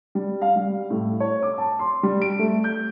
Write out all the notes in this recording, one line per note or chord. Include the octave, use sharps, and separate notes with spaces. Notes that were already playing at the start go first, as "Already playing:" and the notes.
G3
F5
G3
A2
C#5
D6
A5
C6
G3
D7
A3
G6